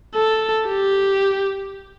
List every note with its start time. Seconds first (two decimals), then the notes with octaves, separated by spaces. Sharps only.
0.15 A4
0.68 G4